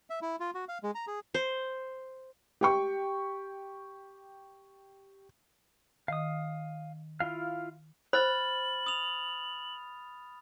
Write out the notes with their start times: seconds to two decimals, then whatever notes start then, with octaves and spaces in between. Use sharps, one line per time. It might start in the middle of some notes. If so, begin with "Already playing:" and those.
0.10 E5
0.22 E4
0.40 F4
0.54 F#4
0.68 F5
0.83 G#3
0.95 A#5
1.07 G#4
1.34 C5
2.61 G4 G5 C#6
6.08 D#3 D#5 F5 D#6
7.20 E4 F4 F5
8.13 C5 B5 F6 A6 F#7
8.86 D#6 F7